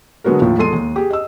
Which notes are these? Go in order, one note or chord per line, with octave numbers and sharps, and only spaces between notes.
D3 F#3 G#3 B3 F#4 A#4
D#2 A2 F3
E2 G#3 A4 C6 C7 D#7
D#2
G4 G#4
D#5 E6